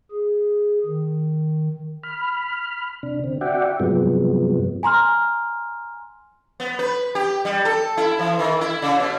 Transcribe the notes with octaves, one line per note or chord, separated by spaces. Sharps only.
G#4
D#3
B5 F6
C3 D4
D3 C4
F#4 D5 E5 F#5 G5
G2 C3 F3 F#3 G#3 B3
G#5 A#5 C6 F6
B3
B4
G4
G3
A4
E4
E3
D#3
E4
C#3
B2